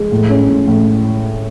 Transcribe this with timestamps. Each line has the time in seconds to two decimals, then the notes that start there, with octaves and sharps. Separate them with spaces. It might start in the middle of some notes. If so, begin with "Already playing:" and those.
Already playing: G#3
0.12 A2
0.30 C#4
0.49 A2
0.67 A2